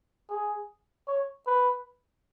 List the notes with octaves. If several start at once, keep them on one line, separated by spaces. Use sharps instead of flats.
G#4
C#5
B4